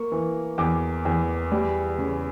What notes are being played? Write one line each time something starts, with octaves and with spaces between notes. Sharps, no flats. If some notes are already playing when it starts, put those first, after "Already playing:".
Already playing: A#3 C#6
E3
E2 D6
E2
G3
C#3